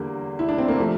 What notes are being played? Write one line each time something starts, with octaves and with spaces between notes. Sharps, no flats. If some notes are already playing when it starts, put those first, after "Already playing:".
Already playing: E2 D3 G3 A#3
E4
D4
C4
A#3
C3 F3 A3